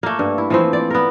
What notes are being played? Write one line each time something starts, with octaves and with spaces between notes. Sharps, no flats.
A3 A#3
G2
E4
E3 F3 C4
D5
B3 A#4